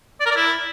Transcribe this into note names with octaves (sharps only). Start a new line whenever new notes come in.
D5
A#4
D5
E4